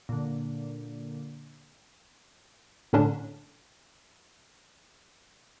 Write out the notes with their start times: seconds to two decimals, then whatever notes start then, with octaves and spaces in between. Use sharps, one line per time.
0.09 A#2 D3
2.93 A2 D3 C#4 D4